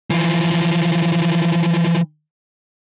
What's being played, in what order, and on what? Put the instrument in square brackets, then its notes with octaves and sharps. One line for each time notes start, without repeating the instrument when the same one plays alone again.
[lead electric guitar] E3 F3